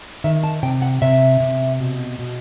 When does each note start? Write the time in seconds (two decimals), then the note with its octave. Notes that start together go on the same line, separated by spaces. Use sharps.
0.24 D#3 E5
0.44 A5
0.63 C3 G5
0.82 F#5
1.02 C3 E5
1.40 C3
1.80 B2
2.19 B2